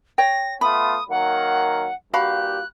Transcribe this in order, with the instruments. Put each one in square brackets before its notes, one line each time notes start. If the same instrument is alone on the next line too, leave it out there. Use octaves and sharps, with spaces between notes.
[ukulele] C#5 G5 [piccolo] A#6
[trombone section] A3 B3 F4 [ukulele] B5 [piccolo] D#6
[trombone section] D#3 F#3 A#3 [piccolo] F#5
[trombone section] G2 A#2 G4 [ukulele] F#4 F5 B5 [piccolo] F#6